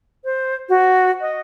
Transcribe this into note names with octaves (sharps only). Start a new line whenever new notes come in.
C5
F#4
D#5